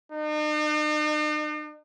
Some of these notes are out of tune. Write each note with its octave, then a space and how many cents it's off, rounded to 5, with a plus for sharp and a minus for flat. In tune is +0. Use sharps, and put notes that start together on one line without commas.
D#4 -45